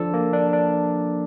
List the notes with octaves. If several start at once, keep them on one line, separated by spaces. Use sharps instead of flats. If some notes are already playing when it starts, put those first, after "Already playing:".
Already playing: F3 D4 A4
A#3
D4
D4